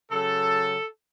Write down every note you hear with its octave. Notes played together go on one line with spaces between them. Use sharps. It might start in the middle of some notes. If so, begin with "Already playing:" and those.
C#3 F#3 A4